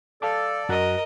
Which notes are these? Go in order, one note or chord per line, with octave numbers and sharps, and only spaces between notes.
A4 D5 F5 A5 D6
F#2 F#4 A#4 D#5 F#6